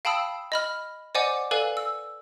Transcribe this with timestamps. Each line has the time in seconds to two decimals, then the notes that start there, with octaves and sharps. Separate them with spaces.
0.05 F5 G5 A5 B5 D#6 E6
0.52 D#5 B5 F6
1.15 C5 D5 D#5 F#5 G#5 D6
1.51 A4 B4 D5 F5 G#5
1.77 E6